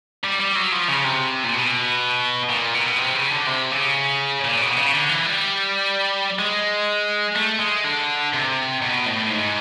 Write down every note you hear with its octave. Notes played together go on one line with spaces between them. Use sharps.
G3
G3
F#3
F3
C#3
C3
A#2
B2
A#2
B2
C3
C#3
D3
C3
C#3
A#2
B2
C#3
D3
E3
G3
G#3
A3
G#3
D3
C3
B2
A2
G#2